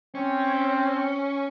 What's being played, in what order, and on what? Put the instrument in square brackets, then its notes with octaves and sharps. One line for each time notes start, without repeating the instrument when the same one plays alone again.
[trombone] C4 [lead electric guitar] C#4